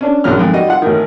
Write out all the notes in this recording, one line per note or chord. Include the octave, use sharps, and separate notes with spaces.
C#4 D4
A#1 F#2 F#3 F6
F2 G#2
G3 F#4 D#5
F4 F#5
A1 D#3